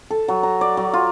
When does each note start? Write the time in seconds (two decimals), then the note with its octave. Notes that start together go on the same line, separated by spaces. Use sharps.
0.11 A4
0.28 F#3
0.43 A#5
0.61 D5
0.77 F#3
0.93 F4